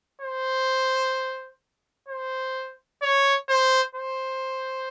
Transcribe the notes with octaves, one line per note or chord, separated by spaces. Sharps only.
C5
C5
C#5
C5
C5